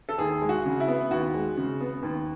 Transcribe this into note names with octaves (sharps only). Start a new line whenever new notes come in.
A4
D#2 G#4
G#3
F#4
C#3
E4
B3
D#2 F#4
G#3
C#3
B3
D#2